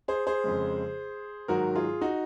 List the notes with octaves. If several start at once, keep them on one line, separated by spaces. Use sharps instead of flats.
G#4 C5
G#4 C5
F2 C#3 G#3
G#2 D#3 F#3 F#4 A#4
F4 G#4
D#4 F#4